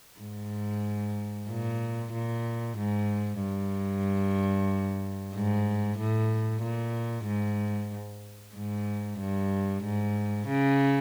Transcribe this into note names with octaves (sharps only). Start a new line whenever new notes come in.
G#2
A#2
A#2
G#2
G2
G#2
A2
A#2
G#2
G#2
G2
G#2
C#3